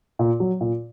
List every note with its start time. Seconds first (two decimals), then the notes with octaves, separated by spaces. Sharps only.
0.19 A#2
0.40 F#3
0.61 A#2